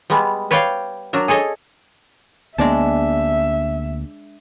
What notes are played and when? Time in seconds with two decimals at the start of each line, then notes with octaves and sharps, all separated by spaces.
0.10 G3 G#3 B3
0.51 B4 C#5 D5 F5 G5
1.13 F#3 D4 A#4
1.28 G#4 A4 C#5 D#5
2.58 D2 G#3 A#3 B3 D4 E5 A5